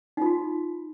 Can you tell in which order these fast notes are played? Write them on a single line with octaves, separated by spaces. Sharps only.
D#4 F4 F#4